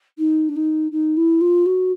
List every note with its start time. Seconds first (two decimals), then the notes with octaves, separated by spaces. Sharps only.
0.18 D#4
0.48 D4
0.56 D#4
0.91 D#4
1.16 E4
1.40 F4
1.65 F#4